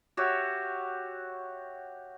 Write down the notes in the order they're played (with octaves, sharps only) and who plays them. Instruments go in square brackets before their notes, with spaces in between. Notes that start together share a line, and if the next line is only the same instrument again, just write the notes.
[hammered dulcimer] F#4 G4 C#5 E5